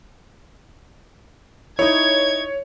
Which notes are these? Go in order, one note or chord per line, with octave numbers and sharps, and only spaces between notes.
D#4 E4 C#5 G#6